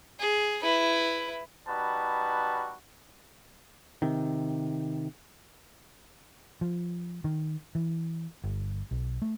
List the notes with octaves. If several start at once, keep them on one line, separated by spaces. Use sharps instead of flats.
G#4
E4 B4
G3 D#4 F#4 B4 A5
C3 D#3
F3
D#3
E3
G1
B1
A3